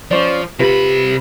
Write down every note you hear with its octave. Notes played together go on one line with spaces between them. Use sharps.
F3 C#4 C5 D5
C3 F4 G4 B4 B5